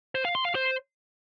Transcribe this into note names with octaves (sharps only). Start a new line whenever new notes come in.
C5
F5
C6
F5
C5